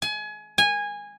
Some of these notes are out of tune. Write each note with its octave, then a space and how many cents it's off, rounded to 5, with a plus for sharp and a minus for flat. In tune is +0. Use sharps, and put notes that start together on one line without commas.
G#5 +30
G#5 -15